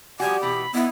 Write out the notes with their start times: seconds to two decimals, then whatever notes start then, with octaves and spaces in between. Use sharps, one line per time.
0.20 F3 G3 F#4 G4 G#5
0.42 B2 E3 B3 B5
0.74 B3 D#4 E4